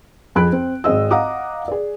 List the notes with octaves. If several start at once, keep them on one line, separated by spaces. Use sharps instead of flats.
F2 G#4 B5 F#6 D7
C4
G#1 C4 G#4 D#5 E6
D#5 F5 F#5 A#5 D6 D#6
G#4 D5